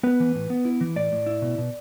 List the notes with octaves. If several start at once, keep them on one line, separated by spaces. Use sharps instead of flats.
B3 B4
E3
A2
B3
E4
E3
A2 D5
A2
E4
B2
B2